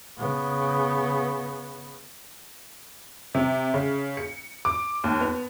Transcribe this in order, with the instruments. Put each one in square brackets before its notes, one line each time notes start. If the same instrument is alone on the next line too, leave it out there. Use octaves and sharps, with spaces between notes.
[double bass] C#3 B3
[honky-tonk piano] C3
C#3
C#7
D6
D#2
B3